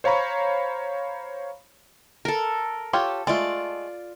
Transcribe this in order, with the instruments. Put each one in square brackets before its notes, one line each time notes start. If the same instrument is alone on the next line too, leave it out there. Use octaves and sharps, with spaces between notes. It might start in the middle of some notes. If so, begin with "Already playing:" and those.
[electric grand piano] C5 C#5 F5 A#5 B5 C#6
[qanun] A4 A#4
[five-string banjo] F4 G4 C#5 [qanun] A4
[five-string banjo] G#3 A3 [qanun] F4 D5